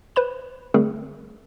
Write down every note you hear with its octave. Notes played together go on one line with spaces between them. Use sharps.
B4 C5 B5 E7
D3 G3 A3 C4 G#4 A#4